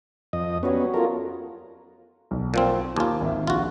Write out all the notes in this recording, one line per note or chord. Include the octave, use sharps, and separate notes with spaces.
F2 D#5
F#3 G3 B3 C#4 C#5
A3 E4 F4 A#4
B1
A#2 F3 C4
D#2 F4 G#5 A5 D6
G#1 E5
A#1 F4 F#4